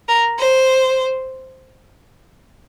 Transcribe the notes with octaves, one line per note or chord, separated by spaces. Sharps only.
A#4
C5